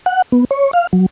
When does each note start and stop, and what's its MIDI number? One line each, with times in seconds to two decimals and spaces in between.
0.06 0.22 78
0.32 0.45 59
0.51 0.71 73
0.73 0.87 77
0.93 1.06 54